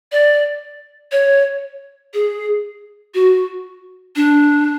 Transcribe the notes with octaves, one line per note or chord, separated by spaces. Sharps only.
D5
C#5
G#4
F#4
D4